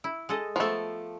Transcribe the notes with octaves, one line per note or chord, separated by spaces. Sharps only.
E4
G#3 A4 D#5
F3 A3 B3 A4